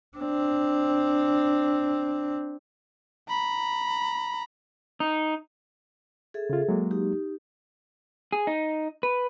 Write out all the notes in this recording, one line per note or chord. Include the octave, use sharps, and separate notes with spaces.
C4 D4
A#5 B5
D#4
G#4 A4 E5
C#3 F4
F#3 G#3 A#3
D#4 G4
G#4
D#4
B4